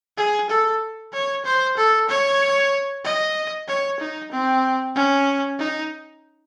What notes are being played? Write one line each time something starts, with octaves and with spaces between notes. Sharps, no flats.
G#4
A4
C#5
C5
A4
C#5
D#5
C#5
D#4
C4
C#4
D#4